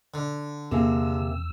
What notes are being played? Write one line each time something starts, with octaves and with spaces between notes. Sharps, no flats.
D3
E2 C3 A#3 G#4 E6